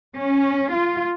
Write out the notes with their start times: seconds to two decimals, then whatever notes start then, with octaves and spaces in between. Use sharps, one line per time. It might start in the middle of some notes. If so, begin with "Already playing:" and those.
0.16 C#4
0.74 F4